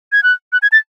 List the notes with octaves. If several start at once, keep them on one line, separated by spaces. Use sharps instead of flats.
G#6
F#6
F#6
G#6
A6